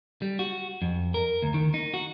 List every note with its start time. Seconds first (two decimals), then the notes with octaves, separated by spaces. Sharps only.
0.22 G3
0.39 F#4
0.82 F2
1.14 A#4
1.42 D2
1.54 D#3
1.74 D#4
1.94 F#4